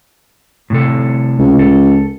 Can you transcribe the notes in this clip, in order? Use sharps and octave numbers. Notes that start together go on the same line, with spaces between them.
A2 C3 A4
C#2
A4